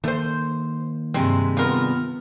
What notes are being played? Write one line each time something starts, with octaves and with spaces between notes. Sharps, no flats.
D#3 A3 A#3 C5
G2 C3 G#3 C4
B3 F4 A#4